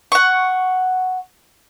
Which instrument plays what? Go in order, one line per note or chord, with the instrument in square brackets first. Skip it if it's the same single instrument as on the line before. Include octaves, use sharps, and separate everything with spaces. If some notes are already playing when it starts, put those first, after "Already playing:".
[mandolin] F#5 C#6